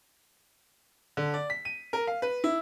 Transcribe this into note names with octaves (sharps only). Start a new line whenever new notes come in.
D3
D5
B6
D#7
A#4
F5
B4
E4